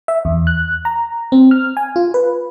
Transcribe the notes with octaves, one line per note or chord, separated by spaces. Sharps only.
E5
E2
F#6
A#5
C4
F6
G#5
F4
B4